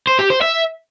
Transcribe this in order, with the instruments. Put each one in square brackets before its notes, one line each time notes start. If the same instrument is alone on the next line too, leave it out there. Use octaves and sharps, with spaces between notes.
[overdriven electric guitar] C5
G4
C5
E5